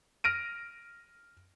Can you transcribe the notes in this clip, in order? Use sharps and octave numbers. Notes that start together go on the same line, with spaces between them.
F6 A#6 D7 D#7